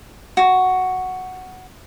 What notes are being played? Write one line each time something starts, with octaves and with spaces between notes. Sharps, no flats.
F#4